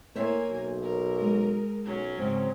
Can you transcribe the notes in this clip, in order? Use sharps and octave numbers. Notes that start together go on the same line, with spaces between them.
A2 A#3 C5 C#5 E5 G#5
B1
A#4
G#3
B1 F#3 C#4
G#2 C#3 C4